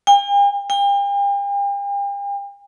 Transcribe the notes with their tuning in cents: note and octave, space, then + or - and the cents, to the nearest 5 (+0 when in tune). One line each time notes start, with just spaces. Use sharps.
G5 +45
G5 +40